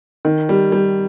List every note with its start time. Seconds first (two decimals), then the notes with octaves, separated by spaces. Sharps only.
0.25 D#3
0.49 G3
0.72 G3